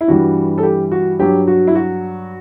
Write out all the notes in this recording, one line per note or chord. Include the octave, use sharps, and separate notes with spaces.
E4
G2 E3 G3 F#4
A4
G4
F#4
G2 F#3 G4
F#4
E4
F#4